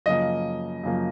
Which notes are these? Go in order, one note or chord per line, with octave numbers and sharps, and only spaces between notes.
F#2 C#3 F3 A#3 D#5
F#2 C#3 F3 A#3